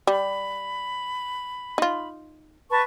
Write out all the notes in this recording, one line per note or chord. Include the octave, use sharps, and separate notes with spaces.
G3 B5
D#4 F4
B4 A5 C#6